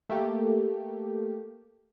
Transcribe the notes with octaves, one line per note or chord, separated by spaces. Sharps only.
A3 A#3 G4